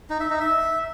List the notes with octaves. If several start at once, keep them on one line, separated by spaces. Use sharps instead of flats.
D#4
E5
D#4
E5